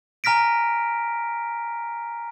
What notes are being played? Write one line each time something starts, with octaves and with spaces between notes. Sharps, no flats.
G#5 A#5 F6 A#6 B6 D7